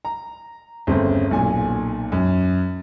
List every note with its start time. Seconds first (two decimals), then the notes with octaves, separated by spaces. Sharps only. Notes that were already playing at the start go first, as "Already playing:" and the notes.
0.05 A#5
0.87 G1 C#3 A3 C4
1.31 B1 A#2 G#5
2.12 F#2